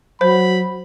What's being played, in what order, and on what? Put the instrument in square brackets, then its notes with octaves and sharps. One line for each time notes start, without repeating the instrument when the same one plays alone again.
[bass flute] F#3 [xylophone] C5 [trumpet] B5